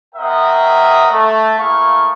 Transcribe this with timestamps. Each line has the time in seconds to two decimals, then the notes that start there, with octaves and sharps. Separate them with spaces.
0.15 C4 A#4 C#5 D#5 E5 F#5
1.12 A3
1.59 A3 A#3 E4 G#4 F5 C#6